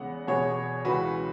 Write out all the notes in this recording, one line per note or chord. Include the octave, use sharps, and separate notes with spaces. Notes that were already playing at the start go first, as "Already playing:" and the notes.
Already playing: E2 C#3 G#3 B3 F#5
E2 B2 B3 G#4 C#5
C#2 C#3 E3 F#4 B4